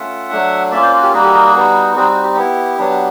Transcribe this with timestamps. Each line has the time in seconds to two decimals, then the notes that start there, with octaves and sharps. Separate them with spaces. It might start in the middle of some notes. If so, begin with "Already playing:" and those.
Already playing: A3 C#4 F4 E5 F#5
0.31 F#3 A3 D4
0.72 A#3 C#4 F4 D5 E5
0.82 C5 D5
0.97 F#4
1.03 G4
1.13 G3 A#3 D#4 F#4 G#4
1.23 G4 A4
1.34 G#4 A#4
1.45 F#4 G#4
1.55 G3 B3 D#4
1.95 G3 C4 D#4 F#4 G#4
2.09 F#4
2.23 G4
2.37 B3 E4
2.78 F#3 B3 D4